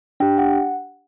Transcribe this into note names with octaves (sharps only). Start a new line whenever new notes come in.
D4 G4 G5
F#5